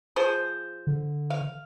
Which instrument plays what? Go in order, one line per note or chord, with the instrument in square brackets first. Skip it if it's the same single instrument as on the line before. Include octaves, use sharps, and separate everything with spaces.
[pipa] F3 G#4 C5
[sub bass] D3
[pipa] F5